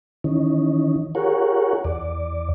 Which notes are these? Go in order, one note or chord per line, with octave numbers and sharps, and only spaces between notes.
D#3 E3 C#4 D#4
F4 G4 G#4 A#4 C#5 F#5
E2 D5